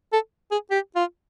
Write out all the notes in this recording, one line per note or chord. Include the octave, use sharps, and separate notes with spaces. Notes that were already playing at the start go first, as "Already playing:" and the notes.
A4
G#4
G4
F4